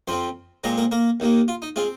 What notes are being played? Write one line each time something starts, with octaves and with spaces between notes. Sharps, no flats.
F2 F3 C4 C5 C6
A#2 G#3 C4 A#4 A#5
A#3 A#4
A#3 A#4
D#2 D#3 A#3
F4
D#4
G#3 C4 F4